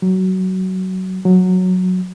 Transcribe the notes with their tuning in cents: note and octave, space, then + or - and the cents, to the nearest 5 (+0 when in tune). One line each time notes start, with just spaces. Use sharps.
F#3 +15
F#3 -10